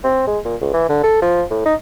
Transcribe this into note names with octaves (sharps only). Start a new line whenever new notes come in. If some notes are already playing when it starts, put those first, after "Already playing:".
C4
G#3
A#2
C#2
E3
D3
A4
F3
A2
D#4